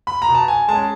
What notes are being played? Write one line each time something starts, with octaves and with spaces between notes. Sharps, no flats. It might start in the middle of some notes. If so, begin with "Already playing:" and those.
B5
A#5
B2
A5
G#5
G#3 C#4 A5